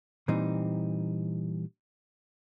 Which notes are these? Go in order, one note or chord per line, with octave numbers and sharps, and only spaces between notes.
A#2 E3 G3 C4 D#4